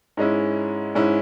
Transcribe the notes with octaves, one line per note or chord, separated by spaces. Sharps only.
G#2 G#3 C#4 E4
G#2 G#3 C#4 E4